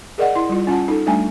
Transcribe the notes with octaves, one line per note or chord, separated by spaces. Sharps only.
G#4 A#4 D5 D#5 F#5
E4 C6
G3 F4
C#4 F4 F#5 A5
D#4 A4
G3 A3 D4 G5 G#5